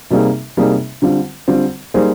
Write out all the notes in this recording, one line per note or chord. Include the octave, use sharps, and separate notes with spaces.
C3 G3 A#3 D#4 G#4
C3 G3 A#3 D#4 G#4
D3 G3 C4 F4
D3 G3 C4 F4
G3 A#3 D#4 G#4 C5